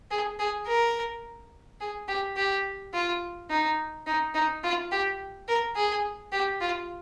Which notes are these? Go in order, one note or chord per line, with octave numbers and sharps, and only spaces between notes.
G#4
G#4
A#4
G#4
G4
G4
F4
D#4
D#4
D#4
F4
G4
A#4
G#4
G4
F4